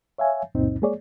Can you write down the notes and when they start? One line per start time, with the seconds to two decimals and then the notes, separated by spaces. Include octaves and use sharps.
0.18 C#5 E5 F5 G#5
0.55 C#2 F#2 A#2 C4 D#4
0.82 G#3 A#3 G#4 C#5 D5